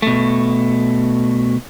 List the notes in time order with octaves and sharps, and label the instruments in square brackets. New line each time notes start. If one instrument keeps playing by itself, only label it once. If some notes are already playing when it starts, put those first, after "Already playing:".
[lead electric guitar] B2 A3